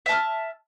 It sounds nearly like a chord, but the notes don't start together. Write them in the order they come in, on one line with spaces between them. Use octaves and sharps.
E5 A5 F6